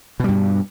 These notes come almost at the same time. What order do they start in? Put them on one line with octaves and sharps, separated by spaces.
B2 G3 G2